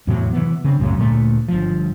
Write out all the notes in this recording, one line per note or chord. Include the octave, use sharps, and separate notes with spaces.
E2 A2 C3 F#3
C3 E3 B3
C#3 C4 D4
C2 F#2 A2 C#3
D2 A#2 F#3 A3
G1 F3